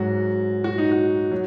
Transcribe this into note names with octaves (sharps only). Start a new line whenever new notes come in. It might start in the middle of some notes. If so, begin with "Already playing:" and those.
Already playing: G#2 F#3 F#4
F#4
D#4
F#4
F#3